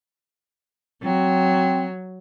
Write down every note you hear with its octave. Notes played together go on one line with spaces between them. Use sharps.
F#3 C4